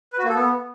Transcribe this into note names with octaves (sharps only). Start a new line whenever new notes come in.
B4
F#4
A#3
A4
B3